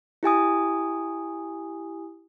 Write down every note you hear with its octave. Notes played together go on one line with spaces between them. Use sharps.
E4 G4 G#5 D#6